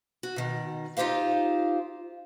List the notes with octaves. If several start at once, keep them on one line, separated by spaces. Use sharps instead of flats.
F#4
B2 D#3
D#4 F4 G4 C5 F5